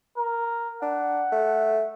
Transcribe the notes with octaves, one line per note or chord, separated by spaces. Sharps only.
A#4
D4 F#5
A3